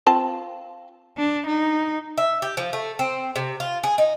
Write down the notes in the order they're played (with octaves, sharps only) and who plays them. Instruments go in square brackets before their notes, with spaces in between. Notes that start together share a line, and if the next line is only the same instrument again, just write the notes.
[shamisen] C4 F4 A5
[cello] D4
D#4
[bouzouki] E5
G4
F3
A3
C4
C3
F4
G#4
D#4